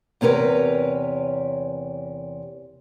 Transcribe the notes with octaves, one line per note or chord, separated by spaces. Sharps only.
E2 C3 C#4 A#4 B4